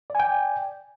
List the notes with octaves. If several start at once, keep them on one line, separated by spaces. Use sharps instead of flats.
D5 G5 G#5